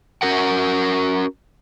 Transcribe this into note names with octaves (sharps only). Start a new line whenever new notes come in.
C#4 F#4 A#4 F#5